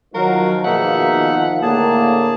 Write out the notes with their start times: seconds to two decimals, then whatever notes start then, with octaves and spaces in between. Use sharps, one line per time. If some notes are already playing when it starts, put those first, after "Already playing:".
0.14 D#3 F3 F#3 F#4 A#4 F5
0.65 B2 A#3 D#4 G#4 E5 F#5
1.62 A2 D3 A#3 G#4 A5